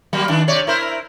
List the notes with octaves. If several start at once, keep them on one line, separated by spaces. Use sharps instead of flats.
F#3 G3 A#3
D#3 D4
C3 C#5 D5
E4 A#4 C5